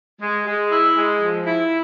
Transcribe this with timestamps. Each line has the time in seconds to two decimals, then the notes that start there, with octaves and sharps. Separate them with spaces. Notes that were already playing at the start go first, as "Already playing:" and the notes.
0.21 G#3
0.46 G#3
0.70 E4
0.96 G#3
1.21 F3
1.46 E4